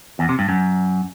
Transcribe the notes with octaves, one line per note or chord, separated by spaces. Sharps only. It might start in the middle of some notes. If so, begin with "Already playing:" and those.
E2
C3
G2
F#2